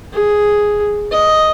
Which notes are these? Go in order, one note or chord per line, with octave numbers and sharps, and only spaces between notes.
G#4
D#5